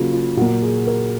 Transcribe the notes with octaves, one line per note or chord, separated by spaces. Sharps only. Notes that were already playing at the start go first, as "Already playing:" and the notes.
Already playing: C#3 F#3 A#3 F4 F#4
F4
A#2 F#3 A#3 F#4
G#4
A#4